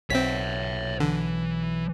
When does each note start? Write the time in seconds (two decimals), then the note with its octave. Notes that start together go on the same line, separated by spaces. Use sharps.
0.10 B1 C4 C#5 E5 B6
1.00 D3 E3